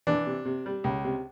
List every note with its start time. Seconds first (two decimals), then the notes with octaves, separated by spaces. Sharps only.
0.07 E3 D4
0.27 C3
0.45 C3
0.66 G3
0.84 C#2
1.04 C3